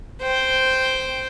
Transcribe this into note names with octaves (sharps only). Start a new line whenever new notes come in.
C5 G5